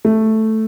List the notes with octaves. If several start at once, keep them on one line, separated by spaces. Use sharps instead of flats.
A3